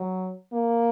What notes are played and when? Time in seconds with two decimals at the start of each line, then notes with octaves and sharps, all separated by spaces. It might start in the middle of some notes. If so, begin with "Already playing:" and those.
Already playing: F#3
0.53 A#3